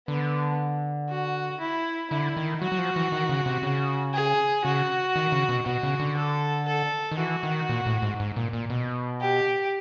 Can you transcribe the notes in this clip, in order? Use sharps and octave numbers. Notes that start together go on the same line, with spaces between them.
D3 B3
F#4
E4
D3 E4
D#3
F#3 F#4
F#3
F3
E3
D#3
C#3
C3
C#3
G#4
C#3 F#4
D#3
C#3
B2
B2 F#4
C#3
D3
A4
A4
D#3
E3 F#4
D#3
A#2
A2
G#2
G#2
A#2
A#2
B2
G4